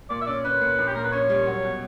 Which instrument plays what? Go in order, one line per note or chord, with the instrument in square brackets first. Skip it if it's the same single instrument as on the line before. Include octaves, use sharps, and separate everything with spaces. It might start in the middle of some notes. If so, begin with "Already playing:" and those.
[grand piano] A#2 [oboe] D5
[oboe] E5
[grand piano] C#4 [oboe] D5
[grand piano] C#4 [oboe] B4
[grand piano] A#2
A#1
[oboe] G4
[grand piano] A#2 [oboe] A#4
[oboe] B4
[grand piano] C#4 [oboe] C#5
[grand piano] G3
F#3
B2